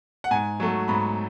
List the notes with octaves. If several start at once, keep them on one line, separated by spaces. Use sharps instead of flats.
F#5
G#2 G#5
F#3 A3
G#2 B5